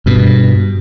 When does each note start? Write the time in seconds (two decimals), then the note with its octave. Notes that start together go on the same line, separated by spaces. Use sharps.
0.06 G2 B2